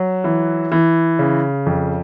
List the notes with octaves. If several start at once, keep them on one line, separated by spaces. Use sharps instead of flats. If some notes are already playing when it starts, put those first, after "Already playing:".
Already playing: F#3
E3
E3
C#3
F2